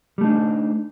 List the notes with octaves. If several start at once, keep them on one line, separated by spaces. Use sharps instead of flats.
G3 A3 D4 D#4